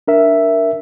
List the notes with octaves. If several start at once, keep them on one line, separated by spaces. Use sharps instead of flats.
D4 A#4 E5